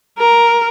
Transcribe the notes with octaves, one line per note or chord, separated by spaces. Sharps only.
A#4